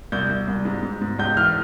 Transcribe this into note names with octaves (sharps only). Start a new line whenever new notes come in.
C2 G6
C2
C2
G#2
G#2
G#2
C#2 G6
E3 F6